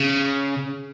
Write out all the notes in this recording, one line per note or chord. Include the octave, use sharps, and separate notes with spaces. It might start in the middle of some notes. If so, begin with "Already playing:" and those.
Already playing: C#3